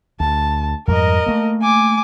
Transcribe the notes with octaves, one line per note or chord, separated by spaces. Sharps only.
D2 A5
F2 G#2 G3 A#4 D#5
A3 A#3
G#5 D6